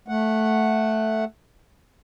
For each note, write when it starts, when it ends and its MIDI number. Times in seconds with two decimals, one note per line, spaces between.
0.08 1.25 57
0.08 1.25 78